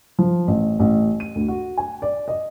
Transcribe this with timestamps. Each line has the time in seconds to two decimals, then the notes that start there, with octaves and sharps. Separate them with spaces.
0.19 F3
0.48 A1
0.80 A1
1.20 D#7
1.35 D2
1.48 F#4
1.77 G#5
2.02 D5
2.28 D#5